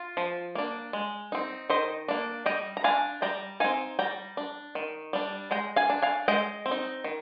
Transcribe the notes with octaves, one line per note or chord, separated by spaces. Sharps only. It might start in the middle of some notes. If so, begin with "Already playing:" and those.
Already playing: F4
F3
A#3 D4
G#3
C4 D#4
D#3 C5 D#5
A#3 D4
G3 D#5 G5
A#5
D4 F5 G#5
G3 G5 A#5
C4 D#4 F5 G#5
G3 G5 A#5
D4
D#3
G3 D4
G#3 G5 A#5
F5 G#5
D4
F5 G#5
G#3 D#5 G5
C4
D#4
D#3